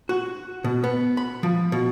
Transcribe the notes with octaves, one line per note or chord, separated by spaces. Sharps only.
F#4
B2
B3
B5
F3
B2